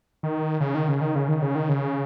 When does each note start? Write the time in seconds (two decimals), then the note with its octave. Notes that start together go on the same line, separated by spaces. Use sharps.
0.23 D#3
0.61 C#3
0.75 D#3
0.88 C#3
1.01 D#3
1.15 C#3
1.29 D#3
1.42 C#3
1.55 D#3
1.69 C#3